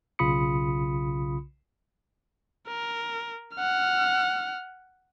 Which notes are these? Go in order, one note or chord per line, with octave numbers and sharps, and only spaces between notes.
B1 C#3 F4 B5 D#6 C#7
A#4
F#5 F6